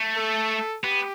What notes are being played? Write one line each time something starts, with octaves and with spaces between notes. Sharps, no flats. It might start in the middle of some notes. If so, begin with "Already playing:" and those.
Already playing: A3
A4
B3 G4